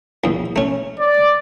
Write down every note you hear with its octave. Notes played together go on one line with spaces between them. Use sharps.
A#1 E2
A3 C#4
D5